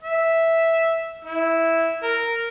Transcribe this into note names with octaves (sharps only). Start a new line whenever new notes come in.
E5
E4
A#4